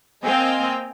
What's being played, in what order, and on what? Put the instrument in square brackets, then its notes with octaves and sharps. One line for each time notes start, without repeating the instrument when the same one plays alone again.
[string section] A#3 C4 D#5 F5 G5 G#5